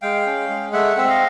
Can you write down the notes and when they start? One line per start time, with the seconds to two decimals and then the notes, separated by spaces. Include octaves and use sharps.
0.02 G#3 F5 G5
0.26 C#4
0.50 G#3
0.73 A3 E5 F#5
0.97 C4 E5
1.09 D#5 F5